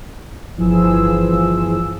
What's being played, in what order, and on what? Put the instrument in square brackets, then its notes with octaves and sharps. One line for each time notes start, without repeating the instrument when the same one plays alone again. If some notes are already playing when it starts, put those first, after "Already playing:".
[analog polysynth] G1 E3 F3 G#4 E6